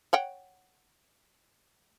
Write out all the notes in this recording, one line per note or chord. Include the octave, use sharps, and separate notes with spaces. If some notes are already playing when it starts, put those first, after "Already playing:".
C#5 F#5 G5